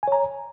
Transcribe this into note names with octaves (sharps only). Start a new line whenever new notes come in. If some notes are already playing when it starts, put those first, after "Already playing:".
C#5 G#5 A#5